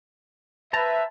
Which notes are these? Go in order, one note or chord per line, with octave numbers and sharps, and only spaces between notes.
B4 C5 E5 A5 A#5